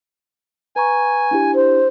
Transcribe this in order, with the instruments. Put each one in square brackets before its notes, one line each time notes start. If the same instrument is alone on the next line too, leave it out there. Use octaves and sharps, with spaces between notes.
[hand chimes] B4 A#5 C#6 [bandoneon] G#5
[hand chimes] D4 E4 G4
[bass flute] C5